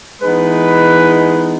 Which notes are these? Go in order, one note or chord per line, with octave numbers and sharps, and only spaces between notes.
E3 G#3 B3 D#4 B4